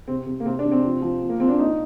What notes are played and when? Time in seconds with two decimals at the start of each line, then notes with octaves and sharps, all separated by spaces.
0.08 C3 C4
0.26 C3
0.40 A#3
0.45 C3 C4
0.59 D4
0.65 C3
0.72 C4
0.84 F3
1.02 F3
1.22 F3
1.29 A#3
1.40 F3 C4
1.49 D4
1.59 A#2 D#4